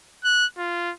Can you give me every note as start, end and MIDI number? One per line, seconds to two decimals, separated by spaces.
0.24 0.46 90
0.58 0.92 65